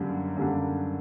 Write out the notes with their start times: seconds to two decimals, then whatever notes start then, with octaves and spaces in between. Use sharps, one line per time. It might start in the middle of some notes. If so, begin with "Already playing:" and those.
Already playing: F#2 D3 G3 A#3 D4
0.37 F#2 D3 G3 A#3 D4